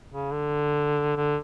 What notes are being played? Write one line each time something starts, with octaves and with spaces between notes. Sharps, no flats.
C#3
D3
D3